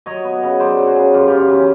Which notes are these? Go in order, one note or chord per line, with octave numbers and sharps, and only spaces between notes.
F#3 C#5 D#5
B3
C#3
F#3 C5 D5
F#3
F#4 G#4
C#3
F#2 F4 G4
C#3 F4 G4
E3 C#4